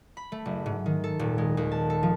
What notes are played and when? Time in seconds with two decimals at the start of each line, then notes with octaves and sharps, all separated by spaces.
0.17 B5
0.32 A3
0.45 F#1
0.66 G#2
0.86 D#3
1.04 A4
1.19 D#1
1.38 G#3
1.57 D#2
1.72 A5
1.90 A4
2.03 F3